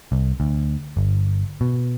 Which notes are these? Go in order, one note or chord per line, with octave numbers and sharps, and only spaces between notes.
C2
D2
G1
B2